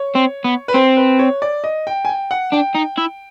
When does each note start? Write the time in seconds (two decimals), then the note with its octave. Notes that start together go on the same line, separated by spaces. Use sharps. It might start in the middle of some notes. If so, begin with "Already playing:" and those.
Already playing: C#5
0.15 C4
0.44 B3
0.68 B4
0.74 C4 C5
0.97 B4
1.19 C#5
1.42 D5
1.64 D#5
1.87 G5
2.05 G#5
2.09 G5
2.31 F#5
2.53 D4 G5
2.75 D#4
2.98 E4